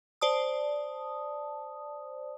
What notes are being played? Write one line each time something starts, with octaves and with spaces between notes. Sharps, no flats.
C5 D5 A5 D#6